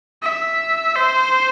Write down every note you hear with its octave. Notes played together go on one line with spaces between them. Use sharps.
E5
C5